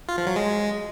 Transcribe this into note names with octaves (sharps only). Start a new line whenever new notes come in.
F4
F3
F#3
G#3